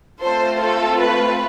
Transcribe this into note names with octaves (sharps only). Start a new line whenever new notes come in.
A3 C4 F4 A4 C5
A4
B4